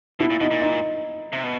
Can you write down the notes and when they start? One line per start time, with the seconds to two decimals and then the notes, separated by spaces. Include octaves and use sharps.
0.20 B2 E4
0.30 A#2
0.40 B2 D#4
0.51 A#2
0.62 D#4
1.33 C3
1.44 B2